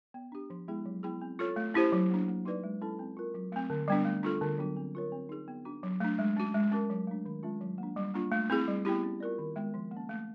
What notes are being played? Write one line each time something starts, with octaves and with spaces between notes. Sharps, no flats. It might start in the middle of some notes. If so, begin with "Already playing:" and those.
B3
D4 G4
F3
G#3 B3 E4 G#4
F#3
B3 E4 G#4
C4
F4 A4 C#5
A3
C#4 E4 G4 C5
F#3
A#3 D4
A#3
D#4 F#4 B4 D5
G#3
C#4 E4 A4
C4
F4 A#4
F#3
A3 C4
D3
G3 B3 D4
A3
D4 F4 A4
D3
F#3 B3 D4 F#4
C4
F4 A#4 C#5
C4
D#4 G#4
B3
D4 F#4
F#3
A3 D4
G#3
C#4 F#4
G#3
C#4 F#4 A#4
F#3
A3 D4
D#3
G#3 C#4 F4
F#3
A#3
D4
G3
A#3 D4 F4
A3
C4 E4 G#4
G3
B3 E4 G4
C#4
F4 A#4 D5
D#3
G#3 B3
F3
A#3
C#4
A3